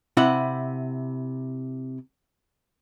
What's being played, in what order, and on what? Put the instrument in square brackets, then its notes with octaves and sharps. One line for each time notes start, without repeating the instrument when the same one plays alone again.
[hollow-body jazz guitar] C3 E4 F#5